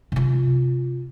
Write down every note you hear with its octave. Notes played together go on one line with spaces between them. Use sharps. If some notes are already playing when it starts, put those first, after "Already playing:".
C3 F4